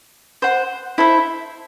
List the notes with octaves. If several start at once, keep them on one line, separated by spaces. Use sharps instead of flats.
C5 F#5 C6
E4 A4 C5 E5